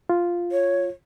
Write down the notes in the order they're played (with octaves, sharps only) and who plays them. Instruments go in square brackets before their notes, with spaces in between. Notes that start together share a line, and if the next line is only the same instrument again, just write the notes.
[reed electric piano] F4
[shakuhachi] C#5